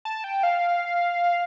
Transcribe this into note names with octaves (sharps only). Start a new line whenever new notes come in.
A5
G5
F5